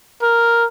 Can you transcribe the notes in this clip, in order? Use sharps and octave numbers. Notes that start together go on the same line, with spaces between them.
A#4